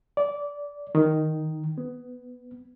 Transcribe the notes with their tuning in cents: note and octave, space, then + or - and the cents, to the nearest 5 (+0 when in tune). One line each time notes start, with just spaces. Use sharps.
D5 -20
D#3 +0
B3 +15